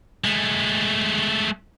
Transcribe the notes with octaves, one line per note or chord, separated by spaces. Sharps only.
G#3 A3